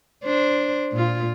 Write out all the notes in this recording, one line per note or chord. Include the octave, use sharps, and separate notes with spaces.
D4 C5
A#2 F4